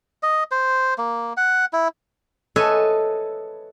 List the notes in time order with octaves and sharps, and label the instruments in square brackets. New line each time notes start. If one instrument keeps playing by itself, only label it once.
[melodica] D#5
C5
A#3
F#5
E4
[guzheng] A4 B4 C#5 D#5 E5 G#5